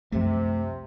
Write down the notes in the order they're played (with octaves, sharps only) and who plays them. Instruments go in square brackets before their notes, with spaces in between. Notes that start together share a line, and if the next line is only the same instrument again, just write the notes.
[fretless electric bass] C2 F#2 F3 [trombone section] C3 [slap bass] A3